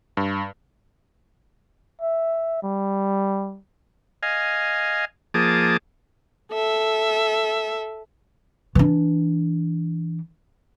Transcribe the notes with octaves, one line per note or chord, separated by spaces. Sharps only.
G2
E5
G3
D#5 F5 G#5
F3 A#3 G#4 A5 D6 D#6
A4 E5
E3 D4